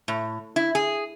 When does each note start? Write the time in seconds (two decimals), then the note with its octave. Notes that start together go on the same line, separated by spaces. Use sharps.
0.08 A2
0.56 E4
0.75 G#4